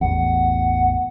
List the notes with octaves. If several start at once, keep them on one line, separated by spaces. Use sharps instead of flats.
A1 E2 F#5